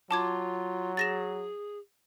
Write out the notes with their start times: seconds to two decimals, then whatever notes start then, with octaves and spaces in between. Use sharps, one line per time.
0.11 F#3 F4 A5 D6 G#6
0.97 G#4 A6 A#6 E7